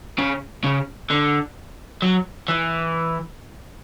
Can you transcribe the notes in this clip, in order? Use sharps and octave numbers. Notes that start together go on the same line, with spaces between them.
C#3
C#3
D3
F#3
E3